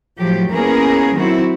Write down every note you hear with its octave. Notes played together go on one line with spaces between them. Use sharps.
A2 F3 F#3 G4
A#3 B3 C#4 E4 G#4 A#4
D#3 F#3 C4 E4 F#4